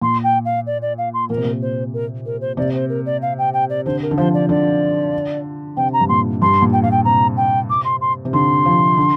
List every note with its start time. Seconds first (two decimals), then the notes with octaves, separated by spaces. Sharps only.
0.01 A#2 C6
0.24 G5
0.45 F5
0.67 D5
0.82 D5
0.98 F5
1.14 C6
1.29 A#2 A#4
1.37 C3
1.45 A#2
1.62 C5
1.94 A#4
2.26 A#4
2.41 C5
2.57 C3 D5
2.74 C5
2.89 A#4
3.06 D5
3.22 F5
3.38 G5
3.53 G5
3.70 D5
3.86 D3 C5
4.02 A#4
4.11 D3
4.17 F3 C5
4.34 D5
4.49 D3 D5
5.77 C3 G5
5.93 A#5
6.01 G2
6.09 A#2 C6
6.42 G2 C6
6.62 A#2
6.73 G5
6.83 A#2 F5
6.91 G5
7.05 C3 A#5
7.37 G5
7.70 D6
7.85 C6
8.01 C6
8.25 C3
8.33 D3 C6
8.66 F3
8.97 D3